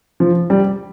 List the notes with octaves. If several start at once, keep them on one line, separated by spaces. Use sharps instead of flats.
F3
G3